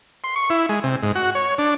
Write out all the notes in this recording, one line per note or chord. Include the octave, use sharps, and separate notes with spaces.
C6
C#6
E4
G#3
C3
G#2
F#4
C#5
D4